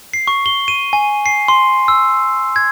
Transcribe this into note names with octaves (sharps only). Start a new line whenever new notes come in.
C7
C#6
G7
D#7
G#5
C7
C6
E6
G#6